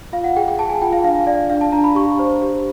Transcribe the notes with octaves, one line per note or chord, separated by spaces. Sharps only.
F4 F5
F#5
G#4 G5
G5
G#4 A5
G#5
F4 G5
F5
D4 F5
D5 F5
D4 F5
A5
D4 A#5
B5
G4 C#6
C5
G4